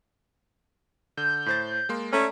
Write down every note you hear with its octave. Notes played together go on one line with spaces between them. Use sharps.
D3 G6
A2 C5 A6
G#3 A#3 C6
A3 C#4 D5 A#5